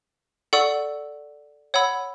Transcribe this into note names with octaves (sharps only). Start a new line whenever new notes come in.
A4 D5 F#5 C#6 E6
C#5 F#5 B5 E6